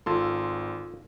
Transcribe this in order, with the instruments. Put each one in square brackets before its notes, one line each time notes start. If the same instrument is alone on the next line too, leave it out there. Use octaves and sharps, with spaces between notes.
[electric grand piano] G#1 C6 [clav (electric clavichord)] F4 A4